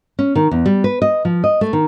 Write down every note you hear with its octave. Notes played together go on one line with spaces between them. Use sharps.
C#4
D#3
E2
G3
B4
D#5
F3
D#5
A3
D#3